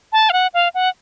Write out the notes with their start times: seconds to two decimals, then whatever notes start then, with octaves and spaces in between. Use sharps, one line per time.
0.13 A5
0.30 F5
0.33 F#5
0.54 F5
0.75 F#5